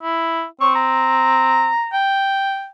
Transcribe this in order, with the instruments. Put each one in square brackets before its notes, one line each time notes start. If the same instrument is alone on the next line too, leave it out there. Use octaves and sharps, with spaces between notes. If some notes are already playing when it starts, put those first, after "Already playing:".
[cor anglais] E4
[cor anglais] C4 [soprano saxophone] C#6
[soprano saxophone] A#5
[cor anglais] G5